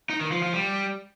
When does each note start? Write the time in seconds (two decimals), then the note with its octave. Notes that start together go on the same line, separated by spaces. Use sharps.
0.09 D#4
0.21 D#3
0.32 F3
0.43 F3
0.54 G3